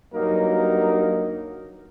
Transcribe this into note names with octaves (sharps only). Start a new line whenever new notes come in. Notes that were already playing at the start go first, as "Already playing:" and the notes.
G2 F#3 A#3 D#4 A#4